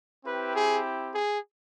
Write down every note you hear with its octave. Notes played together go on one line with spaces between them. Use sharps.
C4 E4 G4 B4
G#4
G#4